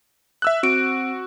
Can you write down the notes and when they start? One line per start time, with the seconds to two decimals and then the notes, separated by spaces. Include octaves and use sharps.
0.42 E5 E6 F#6
0.63 C4 F#4 D7